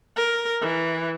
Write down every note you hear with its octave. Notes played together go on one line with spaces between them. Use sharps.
A#4
E3